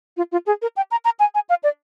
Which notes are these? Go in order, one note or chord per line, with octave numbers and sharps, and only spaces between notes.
F4
F4
G#4
A#4
G5
A#5
A#5
G#5
G#5
F5
D5